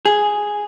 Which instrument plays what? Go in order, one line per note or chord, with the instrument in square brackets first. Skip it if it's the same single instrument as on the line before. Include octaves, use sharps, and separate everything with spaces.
[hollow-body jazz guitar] G#4